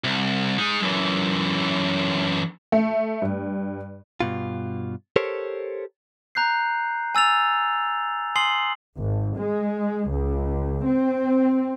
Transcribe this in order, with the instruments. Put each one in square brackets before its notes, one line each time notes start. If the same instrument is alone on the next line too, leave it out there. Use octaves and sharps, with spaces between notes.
[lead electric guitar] C2
G#3 D#4
F#2 E3
[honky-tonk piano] A3
G2
[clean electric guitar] G2 B2 F4
G4 A4 A#4 C5 C#5
[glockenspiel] A#5 F#6 G6 C7
G#5 E6 A6 F7
G#5 C6 D#6 C7 F#7
[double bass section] G#1
G#3
C#2
C4